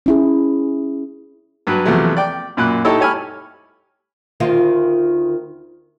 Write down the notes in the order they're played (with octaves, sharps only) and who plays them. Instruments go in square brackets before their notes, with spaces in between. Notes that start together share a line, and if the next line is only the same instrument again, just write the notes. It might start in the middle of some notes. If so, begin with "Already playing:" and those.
[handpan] C#4 E4 G#4
[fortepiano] G2 F#3 B4
E2 C3 F3 F#3 A3
D5 G5
F#2 A#2 B5 F#6
D#4 E4 G4 A4 C#5 A5
G4 C#5 G#5 B5 F6
[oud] D2 D#3 F4